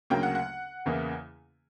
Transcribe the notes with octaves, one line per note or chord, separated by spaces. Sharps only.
D2 C#3 F#3 A#3 G5
F#5
F#5
E2 C#3 E3 A#3